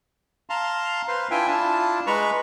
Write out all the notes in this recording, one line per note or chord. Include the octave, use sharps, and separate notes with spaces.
F5 A5 A#5 C6
B4 C5 F5 C6
D4 E4 F4 E5 G5 G#5
D4 E4 F4 A5
G#3 B4 A#5 B5 C#6